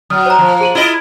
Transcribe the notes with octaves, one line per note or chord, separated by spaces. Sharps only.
F#3 D#6 F6
C5 A#5
F3
G#4 D#7 F#7
E4 F4 D#5